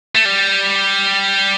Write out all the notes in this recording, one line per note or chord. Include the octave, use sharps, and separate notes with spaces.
A3
G3